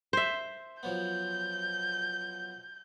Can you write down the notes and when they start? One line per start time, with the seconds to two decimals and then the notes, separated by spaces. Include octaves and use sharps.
0.13 C5 E5
0.83 F3 F#3 B3 G6